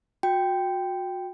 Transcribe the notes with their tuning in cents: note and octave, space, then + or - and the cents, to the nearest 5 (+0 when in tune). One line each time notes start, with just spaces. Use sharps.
F#4 -30 G5 +0